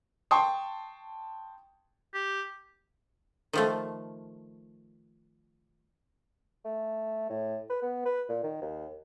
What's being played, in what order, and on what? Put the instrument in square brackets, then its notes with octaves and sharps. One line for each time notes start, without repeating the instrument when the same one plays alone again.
[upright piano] G5 A5 C6 C#6 D#6
[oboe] G4
[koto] D#3 F3 A3
[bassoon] A3
A2
B4
B3
B4
A#2
D#3
D#2